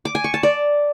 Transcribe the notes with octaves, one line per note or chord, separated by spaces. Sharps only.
D6
G#5
C#6
A5
D5